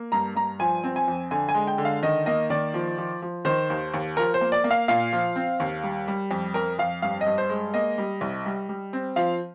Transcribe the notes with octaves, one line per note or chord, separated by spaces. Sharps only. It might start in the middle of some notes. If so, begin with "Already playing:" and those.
Already playing: A#3
G2 A#5
G2 A#5
F3 G#5
C4
G#5
F2
D3 G#5
G#5
G#3
G5
D3
F5
D#3 D#5
A#3 D#5
D#3 D5
F3
F3
F3
D#3 C5
D#2
D#2
F3 A#4
C5
A#3
D5
A#3
F5
A#2 F5
F3
C4
D#2
G3
G3
F2
F2 A#4
F2 F5
G2 F5
D#5
G2
C5
G#3
A#3 D#5
G3
C2
G3
G3
C4
F3 F5